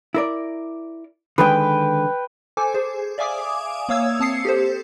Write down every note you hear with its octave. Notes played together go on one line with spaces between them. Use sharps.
E4 A#4 D5
D3 D#3 G#3 B4 G5
A4 C5 G#5 D6
G#4 C5
D5 E5 F5 G#5 D6 D#6
A#3 C#5 F5 D#6 E6 G#6
C4 A5 D#6 C7 C#7
G4 A4 C5